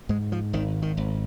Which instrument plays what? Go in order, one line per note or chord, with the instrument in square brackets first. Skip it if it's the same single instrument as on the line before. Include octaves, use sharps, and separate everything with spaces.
[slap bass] G#2 G#3
F3
G#1 D#3
D#3
G#1